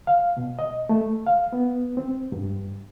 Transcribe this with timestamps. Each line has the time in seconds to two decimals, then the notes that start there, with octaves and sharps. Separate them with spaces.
0.07 F5
0.37 B2
0.59 D#5
0.89 A3
1.27 F5
1.53 B3
1.97 C4
2.32 G2